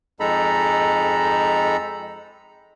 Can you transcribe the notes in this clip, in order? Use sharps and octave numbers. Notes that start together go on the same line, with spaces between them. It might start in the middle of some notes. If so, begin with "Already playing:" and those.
F2 G#3 D#4 A4 A#5 B5